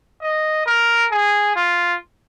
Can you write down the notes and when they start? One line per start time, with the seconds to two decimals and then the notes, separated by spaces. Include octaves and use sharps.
0.22 D#5
0.66 A#4
1.11 G#4
1.56 F4